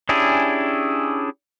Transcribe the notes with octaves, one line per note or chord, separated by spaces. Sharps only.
C#4 D4 E4 G4 G#4